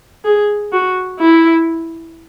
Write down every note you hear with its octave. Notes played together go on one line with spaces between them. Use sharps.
G#4
F#4
E4